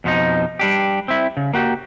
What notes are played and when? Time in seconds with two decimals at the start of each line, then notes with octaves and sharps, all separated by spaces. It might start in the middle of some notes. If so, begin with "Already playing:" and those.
0.04 F2 B2 F3 D#4
0.59 G3 D4 G4
1.08 C4 E4
1.37 C#3
1.53 A#3 F#4 G4